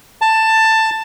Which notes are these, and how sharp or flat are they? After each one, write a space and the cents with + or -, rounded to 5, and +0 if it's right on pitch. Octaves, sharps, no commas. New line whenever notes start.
A5 +10